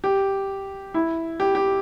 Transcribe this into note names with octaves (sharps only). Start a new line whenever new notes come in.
G4
E4
G4
G4